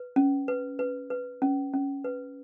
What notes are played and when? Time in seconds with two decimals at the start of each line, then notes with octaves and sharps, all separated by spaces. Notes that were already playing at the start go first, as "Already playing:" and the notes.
Already playing: B4
0.16 C#4
0.48 B4
0.79 B4
1.10 B4
1.42 C#4
1.73 C#4
2.04 B4